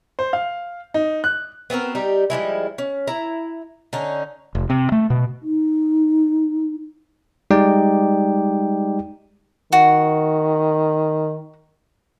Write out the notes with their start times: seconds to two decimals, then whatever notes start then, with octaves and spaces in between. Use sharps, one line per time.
0.19 C5
0.33 F5
0.94 D#4
1.24 F#6
1.70 B3 C4 F#4 A#4
1.95 G3 D#4 G4
2.30 F3 G3 G#3 E4
2.78 C#4
3.08 E4 A#5
3.93 D3 C#4 D#4
4.55 F1
4.70 C3
4.92 A3
5.10 B2
5.43 D#4
7.51 G3 G#3 D#4 G4 D5 G5
9.72 D#3 F#4